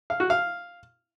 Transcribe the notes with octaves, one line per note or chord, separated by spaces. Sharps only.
F5
F#4
F5